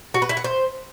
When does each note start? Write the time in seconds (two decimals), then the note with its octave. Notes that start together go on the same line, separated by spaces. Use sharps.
0.14 F#4
0.22 B4
0.29 E4
0.37 F#5
0.44 C5